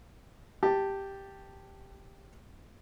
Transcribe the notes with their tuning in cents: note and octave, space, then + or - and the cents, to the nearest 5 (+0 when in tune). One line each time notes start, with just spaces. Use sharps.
G4 +0 A5 +5